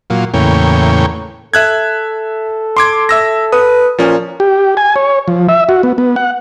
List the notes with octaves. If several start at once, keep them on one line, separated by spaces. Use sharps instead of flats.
A#2 F#3 F4
E2 A2 C#3 A#3 C#5 G5
A4 E5 F#6 G#6
C6 D6 G#6
E5 E6 A#6
B4 D#6
A#2 F3 C#4
G4
G#5
C#5
F3
E5
F#4
B3
B3
F#5